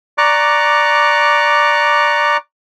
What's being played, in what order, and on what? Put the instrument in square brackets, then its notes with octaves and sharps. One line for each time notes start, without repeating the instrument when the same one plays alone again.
[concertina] D5 A#5 C#6 D6 F#6